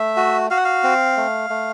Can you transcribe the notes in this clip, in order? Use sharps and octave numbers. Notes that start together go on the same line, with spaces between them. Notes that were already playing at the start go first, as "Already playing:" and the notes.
Already playing: A3 E5
F#4
F#4 F5
F#5
F5
C4
A3
A3